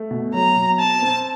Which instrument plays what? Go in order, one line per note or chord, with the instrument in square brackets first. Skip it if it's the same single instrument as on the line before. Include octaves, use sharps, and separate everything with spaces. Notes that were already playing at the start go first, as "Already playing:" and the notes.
Already playing: [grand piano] A3
B2
[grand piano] F#3 [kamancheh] A#5
[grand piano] B2
[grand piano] C4 [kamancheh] A5
[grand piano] C4